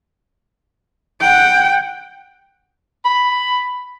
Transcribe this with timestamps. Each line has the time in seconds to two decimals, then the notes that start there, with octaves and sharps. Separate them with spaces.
1.21 F#5 G5
3.05 B5